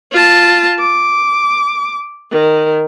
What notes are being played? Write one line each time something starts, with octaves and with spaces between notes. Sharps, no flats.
F4 A5
D6
D#3